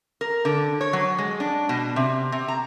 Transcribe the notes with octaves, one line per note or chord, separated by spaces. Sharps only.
A#4
D3
C#5
F#3
G#3
D4
B2
C3
C3
A#5